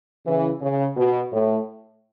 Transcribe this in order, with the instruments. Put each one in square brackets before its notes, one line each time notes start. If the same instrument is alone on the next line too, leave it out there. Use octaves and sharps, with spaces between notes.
[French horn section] C#3 E3
C#3
B2
A2